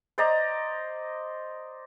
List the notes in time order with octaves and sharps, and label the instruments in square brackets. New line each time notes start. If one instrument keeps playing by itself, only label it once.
[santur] C5 D5 D#5 A#5